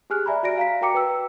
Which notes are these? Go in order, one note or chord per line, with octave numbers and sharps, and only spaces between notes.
G4 G#4 G#5 F6 F#6
D5 E5 G#5 A#5 B5
F#4 D5 A#6 D7
F5 A#5 B6
F#4 A#4 G5 A#5 D6 C#7
B4 G5 E6